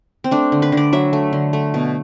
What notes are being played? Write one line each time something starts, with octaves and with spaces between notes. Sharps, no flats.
C4
A3 D4
D3
B4
D3
D5
F#3 E5
A3
D3
A3
B2